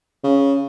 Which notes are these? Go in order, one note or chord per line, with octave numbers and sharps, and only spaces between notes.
C#3